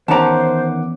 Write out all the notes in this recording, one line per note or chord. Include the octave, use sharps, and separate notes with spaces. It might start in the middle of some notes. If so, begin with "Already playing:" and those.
E2 D#3 C#4 C5 F#5 A5 A#5 D6